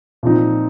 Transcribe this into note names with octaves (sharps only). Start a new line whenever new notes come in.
A#2 F3 C4 D#4